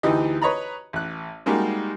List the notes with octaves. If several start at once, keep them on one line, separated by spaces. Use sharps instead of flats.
D2 E3 D#4 G4 D#5
B4 C#5 D#5 A#5 B5
A1 F#6
G3 G#3 A#3 D#4 F#4 G4